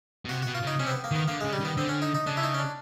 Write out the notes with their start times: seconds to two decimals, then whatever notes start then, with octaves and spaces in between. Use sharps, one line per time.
0.25 B2
0.29 C3 F#4
0.42 F#4
0.47 B2
0.55 F4
0.62 C#3 D#4
0.79 C3 C#4
0.87 C4
0.91 B3
1.04 A#3
1.11 D#3 B3
1.28 D3 A#3
1.41 G#3
1.44 C#3
1.53 G3
1.61 D#3 B3
1.77 D3 C4
1.89 C#4
2.02 D#4
2.15 D#4
2.27 C#3 D4
2.37 E4
2.43 D#4
2.54 C#4
2.59 D4